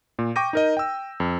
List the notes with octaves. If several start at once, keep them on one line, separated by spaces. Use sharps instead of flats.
A#2
G5 C#6 D6 G6 A#6 D#7
D#4 A#4 D#5
G5 E6
F2